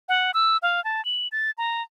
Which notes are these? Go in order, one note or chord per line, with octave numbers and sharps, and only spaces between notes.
F#5
E6
F5
A5
F#7
A6
A#5